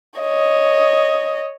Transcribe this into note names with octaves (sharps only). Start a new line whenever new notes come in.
C#5 D#5